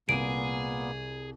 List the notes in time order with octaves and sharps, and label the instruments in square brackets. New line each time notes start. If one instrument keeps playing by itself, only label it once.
[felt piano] C2 D#7 [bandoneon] A#2 A#3 B3 [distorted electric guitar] G#4 [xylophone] D7